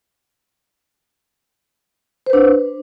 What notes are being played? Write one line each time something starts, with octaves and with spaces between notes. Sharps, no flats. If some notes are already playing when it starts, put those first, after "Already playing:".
D4 B4 C5